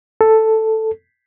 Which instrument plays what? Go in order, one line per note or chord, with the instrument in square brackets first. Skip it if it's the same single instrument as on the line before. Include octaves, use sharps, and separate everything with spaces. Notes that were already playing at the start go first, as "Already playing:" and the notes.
[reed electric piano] A4